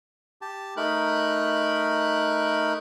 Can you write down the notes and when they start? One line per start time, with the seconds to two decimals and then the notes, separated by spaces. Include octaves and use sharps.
0.42 G4 A5
0.77 A3 D#4 A#4 B5 F#6